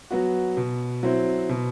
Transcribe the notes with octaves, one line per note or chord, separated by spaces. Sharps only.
F#3 B3 F#4
B2
F#3 C4 E4
B2